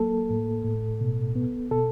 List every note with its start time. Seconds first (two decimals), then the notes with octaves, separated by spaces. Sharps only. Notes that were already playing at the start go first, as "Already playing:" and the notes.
Already playing: F#3 A#3 A4
0.30 A2
0.65 A2
1.01 B2
1.36 B3
1.71 B2 A4